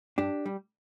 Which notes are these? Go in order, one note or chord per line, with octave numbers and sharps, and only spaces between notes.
G2 D4 G4
G3